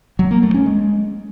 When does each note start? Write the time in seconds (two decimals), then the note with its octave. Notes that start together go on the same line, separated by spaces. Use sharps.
0.19 F#3
0.31 A#3
0.43 A3
0.54 C#4
0.66 G#3